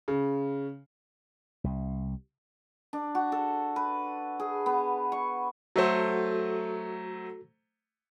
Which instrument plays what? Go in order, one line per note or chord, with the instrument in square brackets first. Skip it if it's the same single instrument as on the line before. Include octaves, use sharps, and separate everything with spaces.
[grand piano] C#3
[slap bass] C2
[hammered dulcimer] D4
F#4
A4
B4
G#4
B3
C#6
[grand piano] F#3 A3 C5 [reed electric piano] F#4 A4